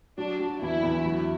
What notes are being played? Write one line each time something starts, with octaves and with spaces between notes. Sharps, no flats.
F#3 D4
F#3
E2 E4
E2
F#3